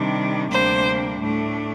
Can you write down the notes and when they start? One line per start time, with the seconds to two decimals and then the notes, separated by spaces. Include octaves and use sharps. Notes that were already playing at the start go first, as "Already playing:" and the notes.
Already playing: C3 D#3 G3 D4
0.51 D2 C3 G3 A#3 D4 C5
1.19 A2 A3 D4